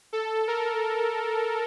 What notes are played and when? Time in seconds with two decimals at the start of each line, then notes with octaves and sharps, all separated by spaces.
0.13 A4
0.48 A#4